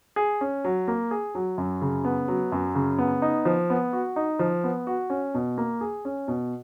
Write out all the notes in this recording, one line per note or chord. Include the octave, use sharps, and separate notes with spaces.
G#4
C#4
F#3
A#3
G#4
F#3
F#2
C#3
B3
F#3
F#2
C#3
B3
D#4
F3
B3
F#4
D#4
F3
B3
F#4
C#4
B2
A#3
G#4
C#4
B2